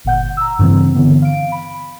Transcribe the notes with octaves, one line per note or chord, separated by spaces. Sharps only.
G1 A#2 F#5 G6
A#5 E6
G2 C#3 E3 C4
D3 E3 B3
F5 D7
B5